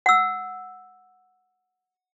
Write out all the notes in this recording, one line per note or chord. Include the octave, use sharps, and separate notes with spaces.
F#5 E6